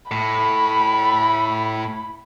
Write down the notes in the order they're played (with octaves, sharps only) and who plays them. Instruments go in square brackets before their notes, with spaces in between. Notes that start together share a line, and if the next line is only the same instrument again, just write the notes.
[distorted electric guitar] A2 [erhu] B5